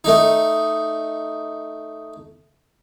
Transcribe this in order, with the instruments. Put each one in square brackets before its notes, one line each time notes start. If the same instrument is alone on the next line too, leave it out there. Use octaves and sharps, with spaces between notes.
[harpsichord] A3 D#4